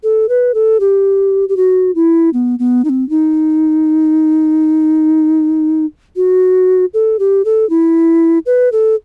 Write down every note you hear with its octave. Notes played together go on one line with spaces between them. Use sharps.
A4
B4
A4
G4
G4
F#4
E4
B3
B3
D#4
C4
D#4
F#4
A4
G4
A4
E4
B4
A4